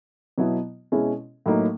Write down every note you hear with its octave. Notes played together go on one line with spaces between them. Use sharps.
B2 F#3 B3 E4
B2 G#3 C#4 E4
A2 F#3 A#3 D#4